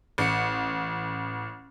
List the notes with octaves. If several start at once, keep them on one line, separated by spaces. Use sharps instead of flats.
A1 C#7